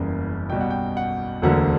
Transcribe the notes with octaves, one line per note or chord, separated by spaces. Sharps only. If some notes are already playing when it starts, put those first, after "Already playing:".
Already playing: F#1 E2 C#3 G3 A#3
B1 B2 G3 G5
F#5
G5
F#5
E1 D2 D3 F#3 A#3 F#5